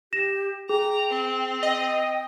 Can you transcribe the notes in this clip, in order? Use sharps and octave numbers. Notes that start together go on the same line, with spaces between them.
G4 A#6 E7
G#4 G5 A#5
C4
D#5 G5